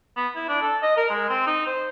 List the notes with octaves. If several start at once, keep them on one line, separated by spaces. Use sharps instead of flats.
B3
E4
D4
A4
D#5
A#4
G#3
C4
D#4
C5